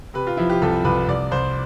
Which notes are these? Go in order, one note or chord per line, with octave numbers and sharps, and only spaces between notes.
C3 B4
F4
F3 E4
G4
C2 A4
C2 B4
C2 D5
C2 C5